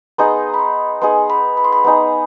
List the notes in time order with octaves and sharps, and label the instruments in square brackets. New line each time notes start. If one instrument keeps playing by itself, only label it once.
[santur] B3 D#4 G#4 [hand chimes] C6
[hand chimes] B5
C6
[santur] B3 D#4 G#4 [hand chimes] C6
[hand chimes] B5
B5
C6
B5
[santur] B3 D#4 G#4